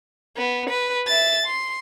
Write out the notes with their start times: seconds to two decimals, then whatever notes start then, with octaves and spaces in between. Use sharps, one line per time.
0.37 B3
0.69 B4
1.07 E5 A6
1.46 C6